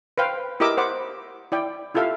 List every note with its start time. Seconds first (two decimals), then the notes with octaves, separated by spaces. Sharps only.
0.18 B4 C5 F5 G5
0.60 E4 G4 A#4 D#5 D6 E6
0.77 C5 F#5 B5 D6
1.52 E4 D5 G5
1.94 E4 F4 G4 A4 E5 F5